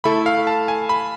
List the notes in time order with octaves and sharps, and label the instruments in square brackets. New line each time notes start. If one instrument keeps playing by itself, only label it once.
[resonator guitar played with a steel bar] A3 E4 A4 [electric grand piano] B5
[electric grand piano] F5
A5
G#5
B5